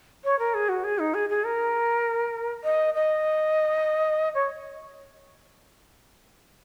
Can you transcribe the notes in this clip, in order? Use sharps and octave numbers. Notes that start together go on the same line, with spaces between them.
C#5
A#4
G#4
F#4
G#4
D#4
G#4
G#4
A#4
D#5
D#5
C#5